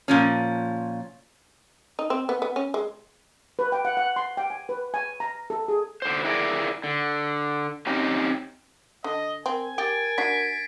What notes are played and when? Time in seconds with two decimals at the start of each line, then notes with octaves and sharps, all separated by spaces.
0.08 A#2 F3 C#4
1.99 D#4
2.10 C4
2.29 B3
2.42 B3
2.56 C#4
2.74 G#3
3.59 B4
3.72 G5
3.85 F#5
3.97 F#5
4.16 C6
4.37 G5
4.50 G#5
4.69 B4
4.94 G#5
5.20 A#5
5.50 A4
5.68 G#4
6.02 D3 C5
6.25 E4 G#4 A#4 D5
6.84 D3
7.87 C4 C#4 D#4 G4
9.04 D3 D#5
9.46 C4 A#4 G#5
9.78 G4 A#4 G#6 A6 D7
10.18 D4 F#4 B6 C7 D7